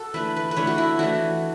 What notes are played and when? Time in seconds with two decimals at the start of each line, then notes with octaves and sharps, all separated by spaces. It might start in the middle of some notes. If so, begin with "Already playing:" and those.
Already playing: F#4 A4
0.14 E3 A3 D4 B4
0.36 B4
0.51 B4
0.56 E3 A3 D4 C#5
0.67 F#4
0.78 E4
0.99 E3 A3 D4 F#4